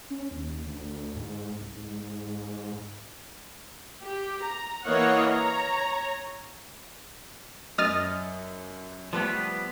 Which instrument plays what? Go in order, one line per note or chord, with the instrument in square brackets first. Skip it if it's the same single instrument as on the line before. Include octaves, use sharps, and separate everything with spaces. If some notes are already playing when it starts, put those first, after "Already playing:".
[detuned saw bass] C#4
D#2
D2
G#2
C2
G#2
[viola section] G4
A#5
E3 A#3 C#5 D#5 F5 F#5
C#5 A#5
[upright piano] F#2 [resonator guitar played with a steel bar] D#5 [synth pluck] D#6 F6 A6
[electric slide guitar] F3 G3 B3 [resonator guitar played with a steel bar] A3 B4 G5